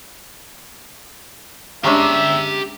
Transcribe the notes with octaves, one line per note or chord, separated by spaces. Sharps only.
G#3 C#4 D4 G4 E5 A#5